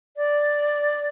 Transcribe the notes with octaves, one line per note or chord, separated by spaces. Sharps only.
D5